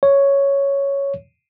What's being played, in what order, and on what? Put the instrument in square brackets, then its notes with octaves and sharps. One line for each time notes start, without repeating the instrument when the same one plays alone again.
[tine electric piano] C#5